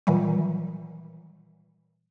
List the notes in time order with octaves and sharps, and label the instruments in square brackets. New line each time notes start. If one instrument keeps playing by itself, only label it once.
[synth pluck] A#2 D#3 E3 F#3 G3